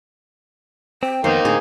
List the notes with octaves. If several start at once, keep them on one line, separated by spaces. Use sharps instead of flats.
C4 G5
F2 D#3 A#3 B3 D#4 C5
A2 D3 C4 G#4